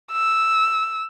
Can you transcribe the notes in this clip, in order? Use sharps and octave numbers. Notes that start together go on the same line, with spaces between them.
E6